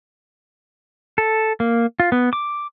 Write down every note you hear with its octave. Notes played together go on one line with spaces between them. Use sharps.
A4
A#3
F4
B3
D6